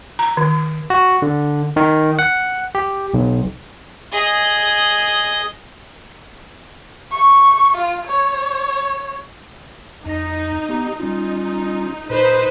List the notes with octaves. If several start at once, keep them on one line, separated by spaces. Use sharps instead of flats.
A#5
D#3
F#4
D3
D#3
F#5
G4
B1
G#4 D#5
C#6
F4
C#5
F2 D#4 A#6
B3 G4 A#5
G3 C#4 D#4 F4
A#2 D#4 B4 C5